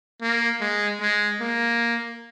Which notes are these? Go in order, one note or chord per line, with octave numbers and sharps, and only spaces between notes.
A#3
G#3
G#3
A#3